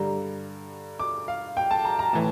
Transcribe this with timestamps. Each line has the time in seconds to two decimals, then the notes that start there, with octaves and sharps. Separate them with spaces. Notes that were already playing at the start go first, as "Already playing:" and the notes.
Already playing: G2 D3 G3 A#5
0.99 D6
1.28 F5
1.57 G5
1.71 A5
1.85 A#5
1.99 A#5
2.13 A2 E3 A5